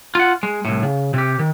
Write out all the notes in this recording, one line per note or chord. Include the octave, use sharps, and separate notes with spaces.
F4 F#5
G#3
C2 A2
C#3
C3 G4
D#3